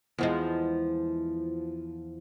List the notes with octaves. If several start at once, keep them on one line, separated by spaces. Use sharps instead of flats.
E2 F3 G#3